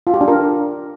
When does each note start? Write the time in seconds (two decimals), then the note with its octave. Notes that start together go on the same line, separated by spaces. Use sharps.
0.07 F4
0.14 G4
0.21 D4
0.28 A#4